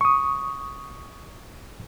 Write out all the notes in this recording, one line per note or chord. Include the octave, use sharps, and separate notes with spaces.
C#6 D#6